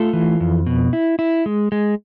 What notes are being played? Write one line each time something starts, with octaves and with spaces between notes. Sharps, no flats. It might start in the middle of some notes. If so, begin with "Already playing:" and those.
Already playing: A3 F4 A4
E3
F2
B2
E4
E4
G#3
G#3